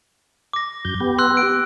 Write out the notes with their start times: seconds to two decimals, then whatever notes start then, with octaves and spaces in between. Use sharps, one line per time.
0.53 D6 A#6
0.85 F#2 G6
1.00 B3 G4
1.18 C6 E6 F#6
1.37 D7